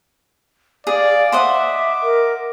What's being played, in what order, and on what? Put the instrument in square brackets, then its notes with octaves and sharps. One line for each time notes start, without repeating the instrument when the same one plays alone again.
[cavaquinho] G#4 [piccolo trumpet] D5 [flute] F5
[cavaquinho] C5 D#5 F#5 [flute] E5 [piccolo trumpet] D6
[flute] A#4